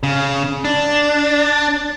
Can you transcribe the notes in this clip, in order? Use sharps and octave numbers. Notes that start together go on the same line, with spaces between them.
C#3
D4